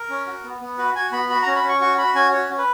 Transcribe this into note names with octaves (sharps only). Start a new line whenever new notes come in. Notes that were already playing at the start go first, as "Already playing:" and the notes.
Already playing: A#4
C#4
F#4
B3
B3
F#4 B4
F#4 G#5
B3 B5
F#4 B5
A#5
C#4
B5
C#4 C#6
F#4 C#6
F#4 B5
C#4 G#5
F#4 C#5
C#4
B4